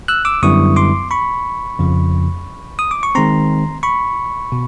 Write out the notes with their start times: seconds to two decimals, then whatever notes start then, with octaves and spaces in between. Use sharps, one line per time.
0.08 E6 F#6
0.25 D6 E6
0.43 F#2 D3 G3 B3 E4 C#6 D#6
0.76 C6 D6
1.11 B5 C#6
1.79 F2 C#3 F3
2.79 D#6
2.91 D6
3.03 C#6
3.15 D#3 G#3 C4 A#5 C6
3.83 B5 C#6
4.52 B2